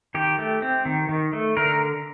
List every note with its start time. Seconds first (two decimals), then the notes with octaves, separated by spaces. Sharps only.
0.15 D#3 G4
0.39 A3
0.62 C4
0.85 D#3
1.09 D#3
1.33 A3
1.57 D3 A#4